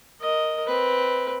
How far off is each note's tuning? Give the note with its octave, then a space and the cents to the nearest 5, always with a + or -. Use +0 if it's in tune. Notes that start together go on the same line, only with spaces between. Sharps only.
A#4 +0 D#5 +0
C4 +0 B4 +0